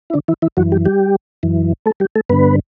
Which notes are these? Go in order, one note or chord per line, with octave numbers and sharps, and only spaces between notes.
E4
D3 D4
E3 E4
E3 E4
F#2 E3 F#3 F#4
G3 G4
G3 G4
F#2 E3
A3 A4
G3 G4
A3 A4
G2 D3 B3 B4